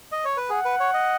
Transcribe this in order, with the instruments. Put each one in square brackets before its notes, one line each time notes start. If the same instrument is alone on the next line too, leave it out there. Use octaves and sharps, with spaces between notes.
[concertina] D#5
C#5
B4
[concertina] G#4 [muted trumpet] F#5
[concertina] B4
C#5
D#5